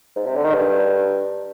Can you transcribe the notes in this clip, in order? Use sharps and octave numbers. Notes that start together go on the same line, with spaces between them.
G#2
C3
D3
D#3
G2